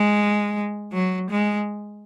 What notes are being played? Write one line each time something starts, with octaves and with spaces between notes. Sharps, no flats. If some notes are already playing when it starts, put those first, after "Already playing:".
Already playing: G#3
F#3
G#3